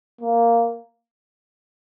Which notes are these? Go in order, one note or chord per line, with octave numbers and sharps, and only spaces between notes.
A#3